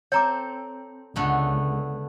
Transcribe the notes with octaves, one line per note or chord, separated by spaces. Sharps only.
C4 A4 C#5 A#5 D6
C#2 D3 A3 B3